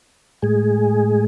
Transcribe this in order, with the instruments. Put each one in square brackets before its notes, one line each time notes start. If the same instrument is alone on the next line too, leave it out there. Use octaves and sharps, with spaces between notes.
[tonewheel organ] A2 G#3 G#4